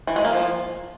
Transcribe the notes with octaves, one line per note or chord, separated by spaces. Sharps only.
E3
G#3
A#3
F3